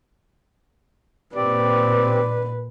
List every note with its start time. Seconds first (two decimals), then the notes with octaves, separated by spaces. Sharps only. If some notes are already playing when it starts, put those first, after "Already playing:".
1.36 A#2 C4 G4 B4 D5